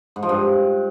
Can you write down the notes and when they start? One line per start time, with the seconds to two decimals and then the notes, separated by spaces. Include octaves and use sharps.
0.16 G#2
0.23 F3
0.29 G2